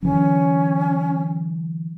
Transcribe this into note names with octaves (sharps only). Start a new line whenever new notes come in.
D3 E3 F#3 C#4